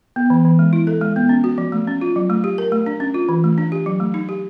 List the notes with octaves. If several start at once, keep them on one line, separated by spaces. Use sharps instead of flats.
B3
E3
E3
G#3
E4
A4
G#3
B3
C#4
F#4
F3
A3
C#4
F4
F#3
A3
G4
A#4
A3
D4
C#4
F4
E3
A3
D4
G4
F#3
A3
D#4
G4